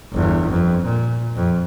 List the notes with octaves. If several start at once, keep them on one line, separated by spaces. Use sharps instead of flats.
G1 E2
F2
A#2
F2